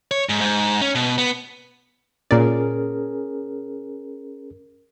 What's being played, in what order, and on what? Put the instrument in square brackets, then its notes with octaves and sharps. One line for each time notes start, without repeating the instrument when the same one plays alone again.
[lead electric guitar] C#5
G#2
G#2
C#4
B2
B3
[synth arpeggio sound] A#2 D5 [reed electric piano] C#4 G#4 A#4